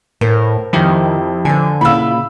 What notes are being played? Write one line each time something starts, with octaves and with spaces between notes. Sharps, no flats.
A2 A#4 C5
F2 D#3 E4 G4 G6
D3 C5 G#5
A#2 C#3 E4 F4 B5 E6